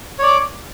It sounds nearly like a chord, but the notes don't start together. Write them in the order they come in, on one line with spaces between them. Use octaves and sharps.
C#5 D5 D6